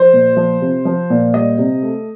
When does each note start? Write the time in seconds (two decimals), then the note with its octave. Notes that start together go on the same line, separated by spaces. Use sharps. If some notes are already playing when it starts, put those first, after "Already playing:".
Already playing: F3 C5
0.13 A#2
0.36 F3
0.61 C3
0.85 F3
1.10 A#2
1.34 G3 D#5
1.58 C3
1.82 A3